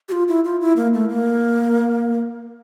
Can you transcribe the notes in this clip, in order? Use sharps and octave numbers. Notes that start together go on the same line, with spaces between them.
G4
F4
E4
F4
E4
A#3
A3
A#3